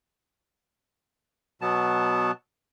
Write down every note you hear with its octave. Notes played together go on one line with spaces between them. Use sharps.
B2 F#3 B3 A5